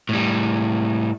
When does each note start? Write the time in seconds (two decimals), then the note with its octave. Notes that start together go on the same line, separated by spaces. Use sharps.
0.09 A2 G3